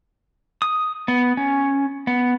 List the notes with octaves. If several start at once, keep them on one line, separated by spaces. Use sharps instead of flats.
D#6
B3
C#4
B3